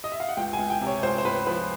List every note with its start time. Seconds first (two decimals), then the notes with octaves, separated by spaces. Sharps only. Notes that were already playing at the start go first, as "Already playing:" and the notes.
0.04 D#5
0.12 E5
0.20 F5
0.29 F#5
0.37 C#2 G5
0.53 G#5
0.59 C#2
0.70 G5
0.81 C3
0.87 C#5
1.03 C#2 C5
1.18 C5
1.25 C#2 B4
1.47 F3 B4